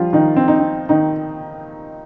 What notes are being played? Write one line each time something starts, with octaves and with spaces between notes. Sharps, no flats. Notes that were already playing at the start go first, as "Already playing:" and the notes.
Already playing: F3 G3 F4
D#3 D#4
C4
D#4
C4
D#3 D#4